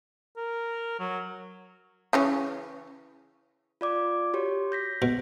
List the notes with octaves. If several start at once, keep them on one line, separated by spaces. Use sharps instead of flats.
A#4
F#3
C#3 E3 C#4
F4 D5 D6
F#4 G4 C#5
G6 A#6 B6
B2